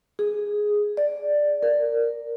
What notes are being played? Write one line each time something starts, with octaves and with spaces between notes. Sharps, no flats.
G#4
D5
A#4